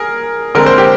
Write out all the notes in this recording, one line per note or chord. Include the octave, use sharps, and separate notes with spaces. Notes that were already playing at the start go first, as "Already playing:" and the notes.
Already playing: G#4 A#4
D3 G#3 C4 A#4
C5
G4